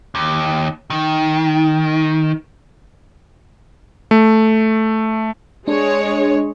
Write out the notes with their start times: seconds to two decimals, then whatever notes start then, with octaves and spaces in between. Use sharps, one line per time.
0.15 D#2
0.90 D#3
4.11 A3
5.68 G#3 D4 C#5